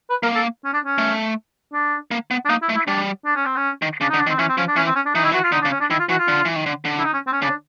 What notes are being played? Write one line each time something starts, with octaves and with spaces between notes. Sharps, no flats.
B4
A#3 A#4
A4
C#4
D4
C#4
A3
D4
A#3
B3
D4
A#3 D#4
E4
A3
E4
G3 D4
D4
C#4
C4
C#4
D#3
C#3 D4
D3 D#4
D4
D#3
C4
E3 C#4
C4
F3 C#4
D4
E3 C#4
C4
C#4
D4
E3 D#4
D#3 E4
E3
F#4
F4
D3 D#4
D4
C#3
C#4
D4
D#3 E4
F4
E3 F#4
F4
D3
E3
D#3
D3
D3
E4
D#4
C#4
C4
C#4
C#3 D4